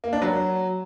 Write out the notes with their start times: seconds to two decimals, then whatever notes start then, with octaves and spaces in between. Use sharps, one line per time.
0.04 A#3
0.13 D4
0.22 F#3